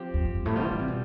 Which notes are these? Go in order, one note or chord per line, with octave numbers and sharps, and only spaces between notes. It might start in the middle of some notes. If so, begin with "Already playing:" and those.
Already playing: F3 C4 G4
E2
F2
G2
A2
G3 B3 F4
E3
D3
C3
B2